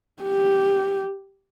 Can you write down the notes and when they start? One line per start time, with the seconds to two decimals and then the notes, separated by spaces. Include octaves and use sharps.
0.23 G4